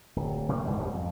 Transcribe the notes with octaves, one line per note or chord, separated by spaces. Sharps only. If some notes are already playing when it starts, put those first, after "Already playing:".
D1
C3 F#3 G3 A#3
C2 G#2 E3 G3
D#1 D#2 C3 G3
F2